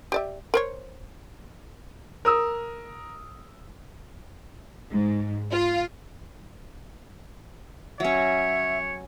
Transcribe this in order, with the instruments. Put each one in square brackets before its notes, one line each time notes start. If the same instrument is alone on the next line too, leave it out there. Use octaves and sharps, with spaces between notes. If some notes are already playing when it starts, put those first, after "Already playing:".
[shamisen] G4 D5 E5
A#4 C5 C#5
[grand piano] A#4 D#6 E6
[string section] G#2
F4
[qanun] F#3 C#4 [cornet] C#5 [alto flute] E5